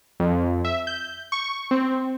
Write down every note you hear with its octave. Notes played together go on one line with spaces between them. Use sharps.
F2
E5
G6
C#6
C4